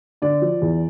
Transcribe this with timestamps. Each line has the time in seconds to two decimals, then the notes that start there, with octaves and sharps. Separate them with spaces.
0.22 D3 D5
0.42 F3
0.61 E2